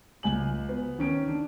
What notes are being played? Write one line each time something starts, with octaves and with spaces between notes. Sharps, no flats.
C#2 G#5 F#7
B3
D#3 C#4 D7
D4